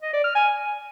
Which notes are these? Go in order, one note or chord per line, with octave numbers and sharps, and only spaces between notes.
D#5
D5
F6
G#5